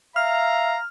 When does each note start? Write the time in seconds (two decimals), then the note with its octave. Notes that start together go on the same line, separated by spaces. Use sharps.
0.16 E5 F5 A#5 F6